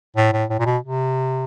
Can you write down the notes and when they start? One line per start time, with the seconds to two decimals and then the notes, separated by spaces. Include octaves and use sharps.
0.17 A2
0.33 A2
0.50 A2
0.60 A#2
0.66 B2
0.83 C3